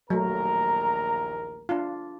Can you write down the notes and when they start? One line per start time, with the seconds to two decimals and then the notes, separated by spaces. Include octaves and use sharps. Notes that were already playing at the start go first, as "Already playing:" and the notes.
0.10 A#1 D#2 F#3 A3 A#4 A#5
1.69 D4 F4